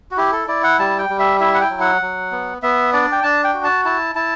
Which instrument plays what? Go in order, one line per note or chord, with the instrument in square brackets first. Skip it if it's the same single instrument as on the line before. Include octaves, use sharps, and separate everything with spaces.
[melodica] F#4
E4 G4
A4
E4 D5
F#5
G3 A5
G5
G3
E5
E4 E5
F#5
G5
F#3
F#5
F#3
B3
B3 E5
D4 D5
G5
D4 A5
G5
F#4
A5
E4 A5
E4 A5